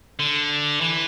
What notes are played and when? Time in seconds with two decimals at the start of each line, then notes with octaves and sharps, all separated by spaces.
0.19 D3
0.81 E3